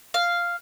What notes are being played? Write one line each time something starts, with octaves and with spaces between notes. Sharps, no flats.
F5